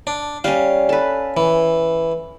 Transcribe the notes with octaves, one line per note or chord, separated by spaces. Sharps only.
D4
G3 C#4 F5
A4 B4
E3